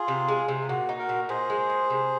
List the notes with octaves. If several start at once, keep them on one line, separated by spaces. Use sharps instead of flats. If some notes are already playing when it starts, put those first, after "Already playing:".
Already playing: F4 G#4
C3
G#3
C3
A#2 F#4
D#4
F#4 A#4
A#2
A#2 G#4 C5
G#3
A#2
C3